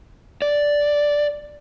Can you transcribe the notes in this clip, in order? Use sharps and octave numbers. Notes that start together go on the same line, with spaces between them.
D5